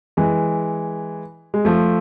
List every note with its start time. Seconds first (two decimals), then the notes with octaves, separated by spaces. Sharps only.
0.17 E3 G#3
1.54 G#3
1.65 F3 A3